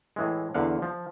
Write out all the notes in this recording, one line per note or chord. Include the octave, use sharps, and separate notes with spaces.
A2 E3 G#3
E2 D3 F5 F#5
F3